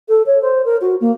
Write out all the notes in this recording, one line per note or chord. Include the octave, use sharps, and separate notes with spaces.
A4
C#5
C5
A#4
F#4
A#3